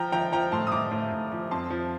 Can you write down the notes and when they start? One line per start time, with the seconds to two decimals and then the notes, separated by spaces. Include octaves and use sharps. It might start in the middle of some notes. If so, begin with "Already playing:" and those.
Already playing: F3 G5 A#5
0.12 F3 G5 A#5
0.32 F3 G5 A#5
0.52 A2 A5 C6
0.67 D#6
0.72 A2 A#5 D6
0.91 A2
1.12 A2
1.32 F3
1.51 F2 A5 C6
1.70 F3